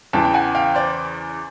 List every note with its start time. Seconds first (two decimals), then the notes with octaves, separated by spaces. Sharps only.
0.13 E2 C#3 E3 G5 A5
0.25 G5
0.34 F#5 G#5
0.55 F5 G5
0.75 C5 D5